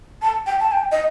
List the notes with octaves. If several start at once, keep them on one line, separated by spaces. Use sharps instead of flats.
A5
G5
A5
G5
D#5